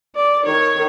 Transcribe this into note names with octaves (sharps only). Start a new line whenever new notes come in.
D5
D#3 C#5